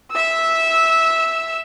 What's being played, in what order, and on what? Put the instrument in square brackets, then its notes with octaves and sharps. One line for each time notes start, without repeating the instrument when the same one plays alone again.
[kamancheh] E5 E6